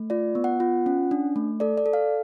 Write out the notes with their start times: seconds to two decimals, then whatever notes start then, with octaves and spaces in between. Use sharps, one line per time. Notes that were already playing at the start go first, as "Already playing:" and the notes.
Already playing: A3
0.10 F4 D5
0.35 B3
0.44 F#5
0.60 F4
0.86 C#4
1.11 D4
1.36 A3
1.60 A4 D5
1.78 D5
1.86 A4
1.93 F5